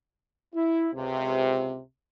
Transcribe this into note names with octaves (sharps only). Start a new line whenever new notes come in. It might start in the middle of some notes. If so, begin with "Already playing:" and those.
E4
C#2 C3